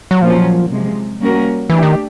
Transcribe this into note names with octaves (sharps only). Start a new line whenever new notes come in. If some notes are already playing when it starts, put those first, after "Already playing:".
F#3
A#2 F3 F#3 A#3 C#4 F4
C3 F3 G#3
G3 A#3 C#4 F#4 A#4
E3 A3 D4 G4
D#3